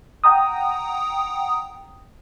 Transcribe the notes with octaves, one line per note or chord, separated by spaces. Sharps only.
F#5 G5 A#5 D#6